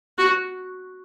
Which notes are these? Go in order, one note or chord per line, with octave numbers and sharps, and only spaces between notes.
F#4